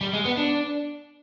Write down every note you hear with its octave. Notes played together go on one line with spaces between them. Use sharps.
G3
G#3
B3
D4